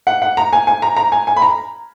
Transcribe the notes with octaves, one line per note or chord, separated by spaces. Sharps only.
F#5
F#5
A#5
G#5
G#5
A#5
A#5
G#5
G#5
B5
A#5